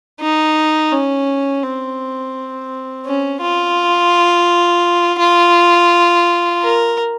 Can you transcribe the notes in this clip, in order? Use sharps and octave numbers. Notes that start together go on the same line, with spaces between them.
D#4
C#4
C4
C#4
F4
F4
A#4